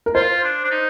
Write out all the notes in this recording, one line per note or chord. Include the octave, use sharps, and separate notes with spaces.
A#4
F4 C5
D4
D4
D#4